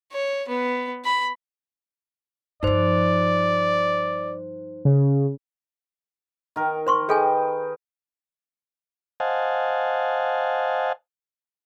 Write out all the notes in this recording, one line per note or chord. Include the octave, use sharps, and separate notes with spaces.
C#5
B3
B5
G2 F3 D#4 C5 D5
C#3
D#3 A#4
C5 C6 C#6
G#4 A4 B4 D#5 G5 G#5
C5 D#5 F5 F#5 G#5 A5